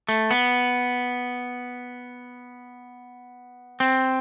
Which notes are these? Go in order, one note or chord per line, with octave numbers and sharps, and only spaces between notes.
A3
B3
C4